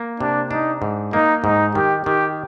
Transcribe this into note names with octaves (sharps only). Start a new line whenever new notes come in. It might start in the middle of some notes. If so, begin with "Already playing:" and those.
Already playing: A#3
C3 D4
D4 D#4
G#2
A#3 D#4
G#2 D#4
D#3 G4
D#3 G4